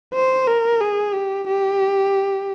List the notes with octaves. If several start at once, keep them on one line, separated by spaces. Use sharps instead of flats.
C5
A#4
G#4
G4
G4